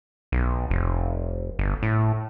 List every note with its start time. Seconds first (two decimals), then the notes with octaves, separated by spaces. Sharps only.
0.32 B1
0.70 F1
1.59 G1
1.83 A2